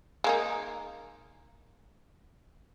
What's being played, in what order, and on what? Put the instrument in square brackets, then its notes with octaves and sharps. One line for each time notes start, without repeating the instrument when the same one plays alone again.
[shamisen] G#3 A#3 D#4